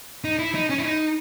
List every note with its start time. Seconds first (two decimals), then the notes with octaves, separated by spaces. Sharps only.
0.24 D#4
0.39 E4
0.55 D#4
0.70 C#4
0.79 E4
0.84 D#4